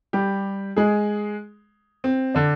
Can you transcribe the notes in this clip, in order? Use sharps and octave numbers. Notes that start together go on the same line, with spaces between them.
G3 G4
G#3 G#4
C4
D3 D4